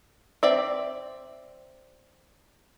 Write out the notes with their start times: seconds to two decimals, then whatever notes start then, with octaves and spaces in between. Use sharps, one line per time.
0.43 C4 D5 E5